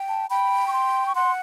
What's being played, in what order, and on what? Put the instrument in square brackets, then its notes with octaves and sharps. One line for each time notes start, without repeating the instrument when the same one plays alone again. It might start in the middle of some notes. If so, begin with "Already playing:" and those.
Already playing: [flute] G5
[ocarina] A5
[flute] G5 [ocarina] B5
[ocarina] C#6
C6
C#6
[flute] F#5 [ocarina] C6